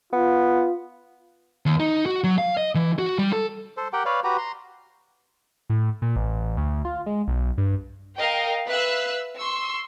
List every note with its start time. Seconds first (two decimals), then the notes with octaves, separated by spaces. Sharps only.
0.13 B3 F4
1.66 D#2
1.80 D#4
2.06 F#4
2.24 F#3
2.38 F5
2.57 D#5
2.75 E3
2.99 F#4
3.19 G3
3.33 A4
3.77 A4 C5
3.93 G4 A#4 F#5 G5
4.05 B4 C#5 D5 F5
4.24 F#4 G4 B4 A#5
4.38 A#5 C6
5.69 A2
6.02 A#2
6.16 A1
6.57 D2
6.85 F4
7.06 G#3
7.28 B1
7.58 G2
8.17 A#4 D#5 F5 G5
8.66 B4 E5 F5 E6 F#6
9.38 C6 C#6 E6